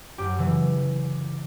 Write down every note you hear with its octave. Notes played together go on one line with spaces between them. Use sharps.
F#2 G4
C#3 E3